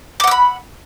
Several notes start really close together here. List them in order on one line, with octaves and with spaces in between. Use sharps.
D6 F#5 E6 B5